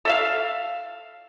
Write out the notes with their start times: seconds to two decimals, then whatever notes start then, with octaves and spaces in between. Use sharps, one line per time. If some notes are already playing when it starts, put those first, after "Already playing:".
0.05 A4 E5 F5